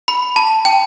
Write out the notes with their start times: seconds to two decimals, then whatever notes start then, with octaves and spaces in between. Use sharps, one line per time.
0.08 B5
0.36 A5
0.65 G5